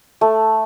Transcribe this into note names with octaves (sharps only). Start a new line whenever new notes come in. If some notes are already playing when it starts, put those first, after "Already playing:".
A3